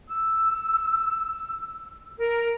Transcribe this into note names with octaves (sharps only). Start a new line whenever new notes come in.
E6
A#4